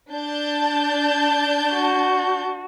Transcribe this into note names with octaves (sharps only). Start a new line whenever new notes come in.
D4 A5 G6
F#4